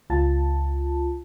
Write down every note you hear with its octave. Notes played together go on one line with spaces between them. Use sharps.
C#2 F4 A5